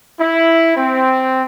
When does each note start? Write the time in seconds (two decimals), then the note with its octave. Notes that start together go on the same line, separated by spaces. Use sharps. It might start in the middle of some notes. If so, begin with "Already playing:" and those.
0.20 E4
0.77 C4